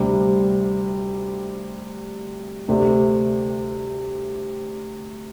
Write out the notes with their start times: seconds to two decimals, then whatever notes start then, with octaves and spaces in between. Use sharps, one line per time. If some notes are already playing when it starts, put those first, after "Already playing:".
Already playing: D2 C3 G3
2.68 D2 C3 A3 D4 G4